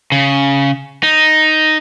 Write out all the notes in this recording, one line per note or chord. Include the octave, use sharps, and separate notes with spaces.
C#3
D#4